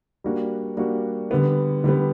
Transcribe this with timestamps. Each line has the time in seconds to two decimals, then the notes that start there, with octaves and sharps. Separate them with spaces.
0.24 G3 A#3 D4 F#4
0.77 G3 A#3 D4 F#4
1.31 D3 G3 B3
1.84 D3 G3 B3